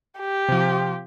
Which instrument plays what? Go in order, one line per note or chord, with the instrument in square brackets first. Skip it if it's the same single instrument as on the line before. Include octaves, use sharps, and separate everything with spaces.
[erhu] G4
[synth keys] C3 F3